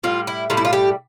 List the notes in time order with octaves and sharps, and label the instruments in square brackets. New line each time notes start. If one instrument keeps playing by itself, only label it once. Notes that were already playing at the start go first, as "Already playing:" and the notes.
[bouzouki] A2 G3 F4
E4
A2 G3 F4
E4
F4
G4